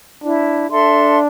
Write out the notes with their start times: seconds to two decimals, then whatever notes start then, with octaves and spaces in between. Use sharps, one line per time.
0.24 D4 E4
0.71 D4 A4 E5 C6